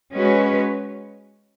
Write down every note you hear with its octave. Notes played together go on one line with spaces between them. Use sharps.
G#3 C#4 F#4 B4